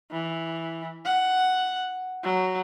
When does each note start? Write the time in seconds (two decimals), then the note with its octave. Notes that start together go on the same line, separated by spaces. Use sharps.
0.11 E3
1.05 F#5
2.24 F#3